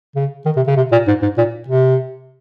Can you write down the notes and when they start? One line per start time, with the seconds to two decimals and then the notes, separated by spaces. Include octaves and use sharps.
0.16 C#3
0.46 D#3
0.56 C3
0.67 C#3
0.77 C3
0.92 A#2
1.07 G#2
1.22 G#2
1.38 A#2
1.68 C3